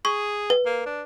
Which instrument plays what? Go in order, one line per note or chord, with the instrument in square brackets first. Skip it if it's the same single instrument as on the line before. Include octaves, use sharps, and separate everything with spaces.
[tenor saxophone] G#4 [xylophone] C#6
[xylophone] B4
[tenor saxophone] A#3
D4